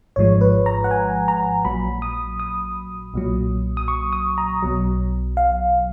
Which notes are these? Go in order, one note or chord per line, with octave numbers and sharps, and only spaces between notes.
G#1 G#2 F3 G#3 C#5
B4
A#5
F#5
G#5
A#5
A#1 A#2 F#3 B5
D#6
D#6
B1 A#2 F#3
D#6
C#6
D#6
A#5
B1 B2 F#3
F5